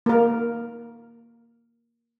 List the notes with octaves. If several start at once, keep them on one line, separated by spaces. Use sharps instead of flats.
A#3 A#4